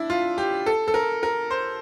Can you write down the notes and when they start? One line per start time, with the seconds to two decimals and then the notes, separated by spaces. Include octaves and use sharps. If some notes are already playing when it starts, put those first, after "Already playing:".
Already playing: D4 E4
0.10 F4
0.38 G4
0.66 A4
0.88 A4
0.94 A#4
1.23 A#4
1.51 C5